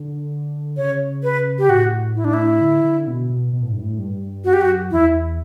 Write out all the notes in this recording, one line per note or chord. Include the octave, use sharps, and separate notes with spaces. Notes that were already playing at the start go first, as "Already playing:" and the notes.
Already playing: D3
C#3 C#5
B4
G4
A2 F#4
E4
D4
E4
D3
D3
B2
B2
B2
A2
G2
A2
G2
F#2 F#4
G4
F#4
E2 E4